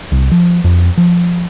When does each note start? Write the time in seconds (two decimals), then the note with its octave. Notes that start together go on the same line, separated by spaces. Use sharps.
0.12 C2
0.32 F3
0.64 F2
0.98 F3